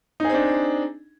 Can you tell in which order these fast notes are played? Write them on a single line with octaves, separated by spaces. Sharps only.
D#4 G#4 C4 D4